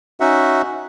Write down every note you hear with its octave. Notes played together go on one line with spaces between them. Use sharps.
C#4 D#4 F#4 E5 F#5